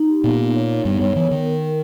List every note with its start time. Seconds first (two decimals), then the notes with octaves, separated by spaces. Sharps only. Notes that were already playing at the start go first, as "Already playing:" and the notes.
Already playing: D#4
0.09 G4
0.23 A#2 B3
0.39 D#4
0.55 C#5
0.70 D#4
0.85 G2 B3
1.01 G2 C#5
1.16 E3 B3
1.31 D#3 A#4
1.46 A#4
1.63 A#4